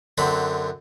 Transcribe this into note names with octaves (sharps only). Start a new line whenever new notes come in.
F#2 D3 F#3 C4 B5